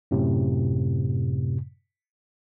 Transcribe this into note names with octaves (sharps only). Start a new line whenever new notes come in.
F#2 A2 C3